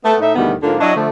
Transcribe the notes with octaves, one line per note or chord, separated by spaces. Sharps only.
A3 B3 E5
A2 D#4 E5
D2 B2 D#3 E3 G3 B3
G#2 D3 F3 A#3 D4 F4
F#3 D4 E4 C#5 D#5
D3 F3 A3